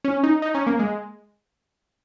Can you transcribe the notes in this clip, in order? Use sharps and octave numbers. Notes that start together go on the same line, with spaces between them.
C#4
D#4
D#4
C#4
A#3
G#3